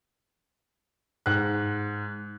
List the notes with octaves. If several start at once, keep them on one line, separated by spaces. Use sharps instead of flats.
G#2 F#6